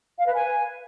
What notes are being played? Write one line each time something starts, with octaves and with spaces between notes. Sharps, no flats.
F5
B4
G#5